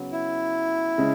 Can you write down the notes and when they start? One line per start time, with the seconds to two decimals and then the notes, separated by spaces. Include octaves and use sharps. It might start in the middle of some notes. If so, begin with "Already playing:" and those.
Already playing: C#3 F#3 B3
0.12 E4
0.98 C#3 G#3